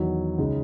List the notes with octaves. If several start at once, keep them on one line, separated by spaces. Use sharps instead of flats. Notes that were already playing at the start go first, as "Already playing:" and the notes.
Already playing: E2 D#3 F#3
C#2 C#3 G#3 D#4